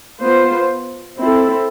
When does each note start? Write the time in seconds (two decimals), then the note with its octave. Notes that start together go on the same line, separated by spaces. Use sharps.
0.21 B3 F4 C5
1.18 C4 E4 A4